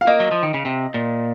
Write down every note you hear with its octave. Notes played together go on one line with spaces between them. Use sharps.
F5
A#3 D#5
F#3
F3
D#3
C#3
C3
A#2